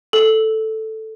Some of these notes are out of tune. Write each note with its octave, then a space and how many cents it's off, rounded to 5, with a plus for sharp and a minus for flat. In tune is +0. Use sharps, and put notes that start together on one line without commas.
A4 +0